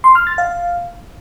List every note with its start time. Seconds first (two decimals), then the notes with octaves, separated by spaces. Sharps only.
0.04 C6
0.15 F6
0.27 A6
0.38 F5